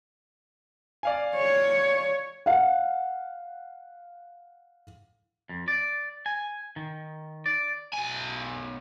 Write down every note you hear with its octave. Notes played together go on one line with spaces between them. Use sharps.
D5 F5 G#5
C#5
F5 F#5
F2
D5
G#5
D#3
D5
B1 G#5